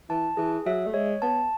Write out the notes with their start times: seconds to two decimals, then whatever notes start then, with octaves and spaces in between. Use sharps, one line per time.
0.09 E3 A5
0.37 E3 G#4
0.66 F#3 E5
0.86 A3
0.94 G#3 C#5
1.22 B3 A5